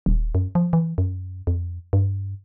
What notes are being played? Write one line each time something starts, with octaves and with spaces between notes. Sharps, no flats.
D#1
F#2
F3
E3
F#2
F2
G2